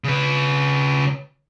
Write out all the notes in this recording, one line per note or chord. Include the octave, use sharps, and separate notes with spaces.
C#3 B4